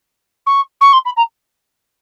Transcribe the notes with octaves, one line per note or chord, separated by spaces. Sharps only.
C#6
C#6
C6
B5
A#5